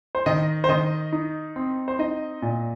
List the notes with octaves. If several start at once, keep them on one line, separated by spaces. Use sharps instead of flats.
C5
D#3 D#5
C5
D#3 D#5
D#4
C4
C5
D#4 D#5
A#2